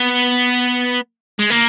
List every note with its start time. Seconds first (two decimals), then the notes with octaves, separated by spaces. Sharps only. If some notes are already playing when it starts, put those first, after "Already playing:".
Already playing: B3
1.39 G#3
1.50 A#3